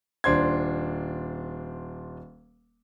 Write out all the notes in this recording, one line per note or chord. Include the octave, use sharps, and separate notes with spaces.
D#1 D4 C5 C6 G#6